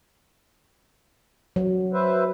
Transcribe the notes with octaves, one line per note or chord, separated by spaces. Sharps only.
F#3
B4 C5 E5